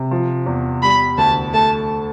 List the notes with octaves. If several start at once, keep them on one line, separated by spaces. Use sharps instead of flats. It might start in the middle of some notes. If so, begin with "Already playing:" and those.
Already playing: C3
F3
E2
G3 B5
D2 A5
A3 A5